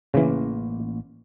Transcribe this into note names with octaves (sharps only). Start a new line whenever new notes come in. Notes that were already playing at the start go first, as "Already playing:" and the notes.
A1 C#3 E3 A#3